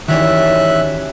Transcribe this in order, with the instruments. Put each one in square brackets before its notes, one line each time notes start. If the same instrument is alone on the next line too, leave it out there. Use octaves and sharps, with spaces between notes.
[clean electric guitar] D#3 E3 [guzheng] G3 C#4 F#4 [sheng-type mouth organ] E5 F#6